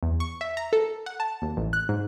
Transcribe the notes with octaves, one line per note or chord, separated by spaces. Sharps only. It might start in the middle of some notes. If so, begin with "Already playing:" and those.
E2
C#6
E5
A#5
A4
F#5
A5
D#2
A1
F#6
G#2